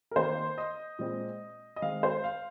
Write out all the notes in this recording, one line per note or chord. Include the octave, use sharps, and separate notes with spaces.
A#4
D#3 A#3 C5
D#5
A#2 G#3 C4
D#5
D#3 G#3 C4 F5
C5
F5